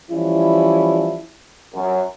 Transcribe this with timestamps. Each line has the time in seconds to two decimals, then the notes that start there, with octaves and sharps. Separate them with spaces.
0.11 E3 F3 G3 C#4 E4
1.74 F#2